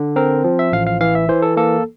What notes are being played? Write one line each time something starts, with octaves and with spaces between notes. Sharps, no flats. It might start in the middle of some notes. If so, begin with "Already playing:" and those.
Already playing: D3
C4 A#4
F3
E5
A1 F5
F5
E3 F5
E5
E3 C5
A4
A#3 A4